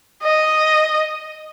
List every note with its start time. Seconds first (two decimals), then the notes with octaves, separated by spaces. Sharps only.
0.23 D#5